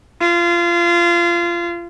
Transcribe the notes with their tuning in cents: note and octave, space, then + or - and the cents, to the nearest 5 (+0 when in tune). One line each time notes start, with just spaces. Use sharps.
F4 -25